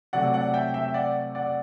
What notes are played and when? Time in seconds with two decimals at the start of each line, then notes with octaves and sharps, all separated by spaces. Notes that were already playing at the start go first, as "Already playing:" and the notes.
0.13 C3 F#3 A3 D5 F#5
0.33 D5 F#5
0.54 E5 G5
0.74 E5 G5
0.85 E5
0.94 D5 F#5
1.35 D5 F#5